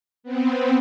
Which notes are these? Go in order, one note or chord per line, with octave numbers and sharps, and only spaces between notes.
B3 C4